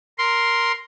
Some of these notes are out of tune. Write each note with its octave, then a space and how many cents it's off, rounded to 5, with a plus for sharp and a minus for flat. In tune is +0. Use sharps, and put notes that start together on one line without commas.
A#4 +0 C6 +0